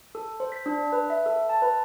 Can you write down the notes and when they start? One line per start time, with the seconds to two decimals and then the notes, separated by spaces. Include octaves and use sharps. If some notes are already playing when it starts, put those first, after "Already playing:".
0.15 A4
0.40 C5
0.52 B6
0.66 D4
0.92 B4
1.10 E5
1.26 A4
1.49 A5
1.62 B4